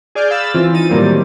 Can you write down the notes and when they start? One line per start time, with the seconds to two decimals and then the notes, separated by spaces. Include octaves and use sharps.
0.15 G#4 D5 F6 G6
0.31 F5 B5 E6 A6 E7
0.55 E3 C4 F4
0.73 E3 D#4 A6 D#7
0.90 A2 D#3 F#3 G3 A#3 C4